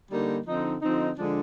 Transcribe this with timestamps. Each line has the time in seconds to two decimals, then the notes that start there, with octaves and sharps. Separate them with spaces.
0.08 D3 G3 A#3 D#4
0.46 D3 F3 C4 D#4
0.82 D3 F3 C4 D#4
1.18 D3 F3 G#3 D4